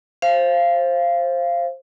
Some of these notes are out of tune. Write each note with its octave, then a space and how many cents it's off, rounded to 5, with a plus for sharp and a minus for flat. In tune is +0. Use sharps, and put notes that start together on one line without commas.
C5 +15 F5 -20